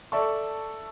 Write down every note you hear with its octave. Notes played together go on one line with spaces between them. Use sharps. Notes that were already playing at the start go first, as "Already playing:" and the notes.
A4 D5 E5 A5 C#6